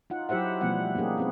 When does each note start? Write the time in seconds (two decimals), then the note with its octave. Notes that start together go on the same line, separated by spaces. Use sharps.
0.10 D#4 F4 F#5
0.29 F#3 E4 G4 C5 E5 F#5
0.61 B2 F3 G3 A3 B3 F#5
0.95 A#3 C#4 D#4 G4 G#4
1.18 C4 G#4 B4